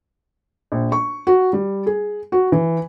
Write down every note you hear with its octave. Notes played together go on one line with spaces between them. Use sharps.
A#1
C#6
F#4
G3
G#4
F#4
E3